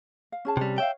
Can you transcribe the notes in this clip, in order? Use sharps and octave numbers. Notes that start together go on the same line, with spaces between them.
F5
C#4 G#4 A5
C3 G3
C#5 E5 F5 G5